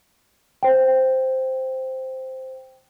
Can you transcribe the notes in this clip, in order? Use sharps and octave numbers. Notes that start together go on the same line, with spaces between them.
C5 G5